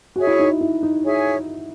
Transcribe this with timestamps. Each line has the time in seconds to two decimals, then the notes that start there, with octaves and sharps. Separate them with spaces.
0.16 F#4 G#4 C#5 E5 G#5
0.27 E4
0.39 D#4
0.61 E4
0.83 D#4
1.04 G#4 C#5 E5 G#5